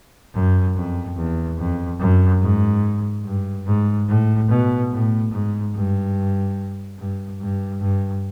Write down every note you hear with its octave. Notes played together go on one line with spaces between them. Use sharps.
F#2
F2
E2
F2
F#2
G#2
G2
G#2
A2
B2
A2
G#2
G2
G2
G2
G2